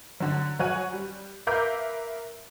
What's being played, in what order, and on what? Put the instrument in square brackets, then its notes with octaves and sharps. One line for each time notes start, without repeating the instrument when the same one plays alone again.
[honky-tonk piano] D3 F#3
F#3 F#4 C#5 G#5 F#6 D#7
G3
A#4 B4 E5 F5 D6 G6